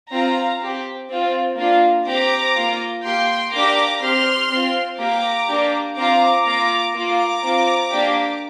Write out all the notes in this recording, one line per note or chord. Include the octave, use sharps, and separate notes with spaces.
C4 F4 F5 A#5
C4 G4
C4 F4
A#3 D4 F4
C4 G4 A#5 D6
A#3 F4
A#3 G4 G5 C6
A#3 D4 G4 A#5 D6
C4 G4 C6 F6
C4 F4
A#3 G4 A#5 D6
A#3 D4 G4
C4 F4 A#5 D6
A#3 F4 A#5 D6
A#3 F4 A#5 D6
C4 F4
A#3 D4 G4